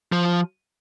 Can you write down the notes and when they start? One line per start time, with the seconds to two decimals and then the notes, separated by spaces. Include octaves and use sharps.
0.12 F3